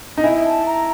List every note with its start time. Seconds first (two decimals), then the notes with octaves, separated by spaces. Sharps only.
0.18 D#4
0.23 E4 G#5
0.45 A5
0.66 A#5